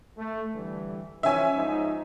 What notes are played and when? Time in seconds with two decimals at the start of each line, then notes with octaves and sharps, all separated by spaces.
0.18 A3
0.54 D3 E3 G3
1.23 E3 F3 C#4 E5 G#5
1.55 G#2 F3 D#4